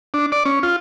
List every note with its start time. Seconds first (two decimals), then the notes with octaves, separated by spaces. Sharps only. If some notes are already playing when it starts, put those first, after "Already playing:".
0.14 D4
0.32 D5
0.45 C#4
0.63 F4